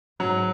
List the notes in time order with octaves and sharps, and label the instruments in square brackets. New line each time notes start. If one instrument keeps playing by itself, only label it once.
[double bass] G#2 [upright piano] F#3